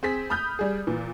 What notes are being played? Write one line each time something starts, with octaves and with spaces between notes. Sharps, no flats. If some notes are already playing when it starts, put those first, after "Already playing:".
C4 G#4 B6
B5 D#6 F6 G6
G3 G#4
A#2 E3